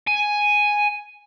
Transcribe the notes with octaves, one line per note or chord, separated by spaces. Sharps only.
G#5